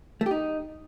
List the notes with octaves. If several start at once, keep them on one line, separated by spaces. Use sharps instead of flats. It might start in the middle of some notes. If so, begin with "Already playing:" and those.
A3
G4
D#4